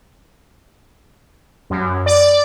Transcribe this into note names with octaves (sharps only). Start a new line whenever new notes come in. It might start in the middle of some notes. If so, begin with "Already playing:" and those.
F#2
D5